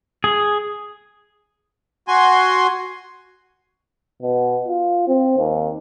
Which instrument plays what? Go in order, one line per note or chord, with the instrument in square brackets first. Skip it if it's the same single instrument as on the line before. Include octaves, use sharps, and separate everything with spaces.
[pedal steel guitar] G#4
[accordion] F#4 G#5 C6
[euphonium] B2
F4
C4
D#2